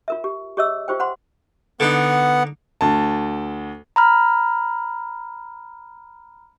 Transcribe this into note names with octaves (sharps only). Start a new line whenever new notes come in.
F4 A#4 E5
G4
G4 G#4 C#5 D#5 E5 E6
F4 G4 C5 G5
C5 F#5 B5 C6
D3 B3 D#4 F#5
D2 A5
A#5 B5 F6